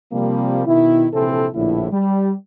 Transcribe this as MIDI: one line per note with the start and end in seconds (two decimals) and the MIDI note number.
0.13 0.62 48
0.13 0.62 53
0.13 0.62 55
0.13 0.62 58
0.67 1.07 47
0.67 1.07 51
0.67 1.07 64
1.13 1.48 34
1.13 1.48 48
1.13 1.48 52
1.13 1.48 60
1.13 1.48 64
1.13 1.48 69
1.54 1.87 34
1.54 1.87 45
1.54 1.87 50
1.54 1.87 64
1.92 2.32 55